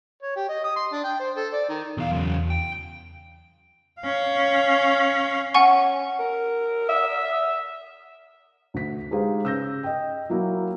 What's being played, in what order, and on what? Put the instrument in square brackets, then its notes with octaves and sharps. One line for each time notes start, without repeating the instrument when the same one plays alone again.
[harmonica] C#5
G4
D#5
D#6
C6
D4
G5
C5
A4
D5
D#3
[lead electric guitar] B1 F5 [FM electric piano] E2
[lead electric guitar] F#2 C#3
G5
[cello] C#4 F5
[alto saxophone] C#4 [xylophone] F#5 G#5 C#6
[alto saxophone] A#4
E5
[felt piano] D2 B6
G#3 D#4 G4 G#4 C5 F5
C#3 E6 G6 A#6
D#5 G5
F#3 A#3 E4 F#4